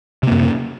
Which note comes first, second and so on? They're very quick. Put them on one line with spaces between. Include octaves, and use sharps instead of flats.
C3 A#3 F#2